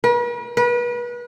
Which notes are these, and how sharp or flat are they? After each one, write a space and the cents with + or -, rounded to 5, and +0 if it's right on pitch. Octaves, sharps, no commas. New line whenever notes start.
B4 -45
B4 -35